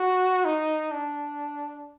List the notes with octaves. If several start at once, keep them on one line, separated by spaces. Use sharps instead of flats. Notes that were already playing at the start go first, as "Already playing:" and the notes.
Already playing: F#4
D#4
D4